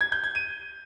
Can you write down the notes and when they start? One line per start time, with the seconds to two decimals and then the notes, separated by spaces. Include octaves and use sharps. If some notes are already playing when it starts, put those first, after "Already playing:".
0.01 G#6
0.12 G6
0.24 G#6
0.35 D#7